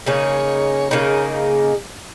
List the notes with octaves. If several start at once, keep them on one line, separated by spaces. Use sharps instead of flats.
C#3 A#3 D#4 G#4 C#5
C#3 A#3 D#4 G#4